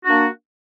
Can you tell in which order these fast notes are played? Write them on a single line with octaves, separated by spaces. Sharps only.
F#4 D4 A#3